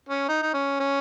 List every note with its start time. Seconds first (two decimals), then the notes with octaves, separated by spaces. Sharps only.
0.09 C#4
0.29 D#4
0.42 D#4
0.54 C#4
0.80 C#4